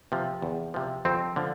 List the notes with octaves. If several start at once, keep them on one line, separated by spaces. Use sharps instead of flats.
C3 F3
E2
C3 F3
F2 C4
D3 F3